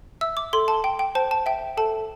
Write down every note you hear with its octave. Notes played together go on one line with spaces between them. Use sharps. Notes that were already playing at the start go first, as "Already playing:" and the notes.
E5 E6
D6
A4 C6
A5
G5
G5
C5 A5
A5
E5 G5
A4 A5